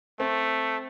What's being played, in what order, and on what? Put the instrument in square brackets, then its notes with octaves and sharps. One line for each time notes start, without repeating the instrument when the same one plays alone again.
[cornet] A3 [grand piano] C4